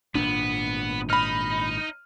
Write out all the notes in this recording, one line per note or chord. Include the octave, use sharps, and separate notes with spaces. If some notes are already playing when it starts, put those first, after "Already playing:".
G#1 A#2 B3 D4
D#4 B5 F6